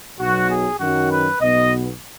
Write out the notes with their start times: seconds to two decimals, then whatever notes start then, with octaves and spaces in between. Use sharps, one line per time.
0.20 B1 B2 F#3 F#4
0.49 G#4
0.79 F#2 D#3 F#3 F#4
1.10 B4
1.40 B1 B2 B3 D#5